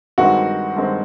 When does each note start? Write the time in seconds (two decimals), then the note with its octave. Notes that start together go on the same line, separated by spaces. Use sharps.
0.18 G2 D#3 G#3 C4 F#4
0.76 G2 D#3 G#3 C4